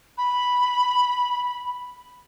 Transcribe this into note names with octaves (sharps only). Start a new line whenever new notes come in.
B5